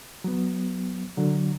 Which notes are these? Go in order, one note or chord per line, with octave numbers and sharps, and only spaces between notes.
F#3 B3
D3 F#3